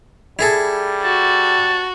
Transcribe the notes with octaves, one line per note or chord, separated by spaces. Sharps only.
G3 E4 G#4 A4
F#4 A5